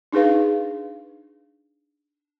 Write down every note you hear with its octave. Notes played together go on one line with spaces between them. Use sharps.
D4 D#4 G#4 B4 F5